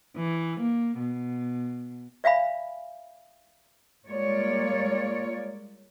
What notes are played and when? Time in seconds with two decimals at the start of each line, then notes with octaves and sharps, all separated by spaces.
0.17 E3
0.60 A#3
0.99 B2
2.24 D5 E5 F5 G#5 B5
4.08 G3 G#3 A#3 F4 C#5 D5